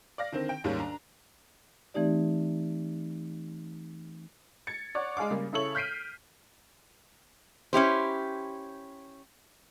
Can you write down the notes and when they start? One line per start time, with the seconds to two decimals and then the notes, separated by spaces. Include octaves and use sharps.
0.18 D5 F5 A#6
0.32 D3 D#3 C4
0.49 G5
0.64 D#2 G#2 D#3 G3 C#4
0.79 D4 A#5
1.94 E3 A3 C4 D#4 G4 D5
4.67 G#6 A6 C#7
4.95 C#5 D5 F#5
5.17 G#3 G#4 F5 D6
5.31 C#3 G3 A#3
5.53 C#3 E4 A4 C#5 F#7
5.75 F6 G6 B6 C7 D7 D#7
7.73 C#4 E4 G4 C5